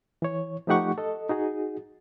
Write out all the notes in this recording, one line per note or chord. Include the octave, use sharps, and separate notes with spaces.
E3 C#5
F3 A3 D#4 G4 F#5 C#6
A4 D#5
D#4 F#4 G#4